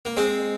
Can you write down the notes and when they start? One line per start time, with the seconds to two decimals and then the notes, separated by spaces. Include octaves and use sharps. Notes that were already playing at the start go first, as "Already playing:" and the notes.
0.05 A#3
0.17 G#3 C4